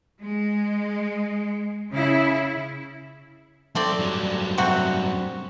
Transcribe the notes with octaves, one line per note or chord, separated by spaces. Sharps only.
G#3
C#3 E4
F#3 A3 C4 D5 C6
G2 F#3
C3 C4 F#4